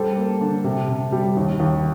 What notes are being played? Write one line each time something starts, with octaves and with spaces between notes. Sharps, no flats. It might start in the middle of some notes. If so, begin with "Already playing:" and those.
Already playing: G3 A4 C5
A#3
D3
C3
C3
G3
D#2
D#2